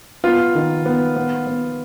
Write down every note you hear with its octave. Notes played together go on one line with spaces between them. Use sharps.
B3 F4
D#3
B3
B3
B3